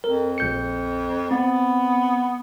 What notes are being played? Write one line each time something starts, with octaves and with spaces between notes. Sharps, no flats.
F2 A#4
A#1 G6 C#7
B3 C4